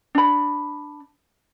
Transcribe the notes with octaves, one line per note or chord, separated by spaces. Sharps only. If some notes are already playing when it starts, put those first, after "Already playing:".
D4 B5